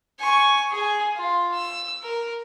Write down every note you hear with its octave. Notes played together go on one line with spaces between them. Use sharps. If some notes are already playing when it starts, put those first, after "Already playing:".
G#5 C#6
G#4 G#5
F4
E6
A#4